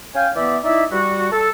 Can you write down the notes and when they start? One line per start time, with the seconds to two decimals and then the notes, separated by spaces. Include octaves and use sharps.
0.15 C#4 F5 G5 G#5
0.36 E3 B3 D5 E5
0.64 D#4 E4 D5 E5
0.91 G3 F#4
1.32 A4